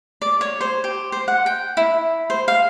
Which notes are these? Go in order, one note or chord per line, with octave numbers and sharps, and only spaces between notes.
D5
C#5
C5
G4
C5
F#5
G5
E4
C5
F5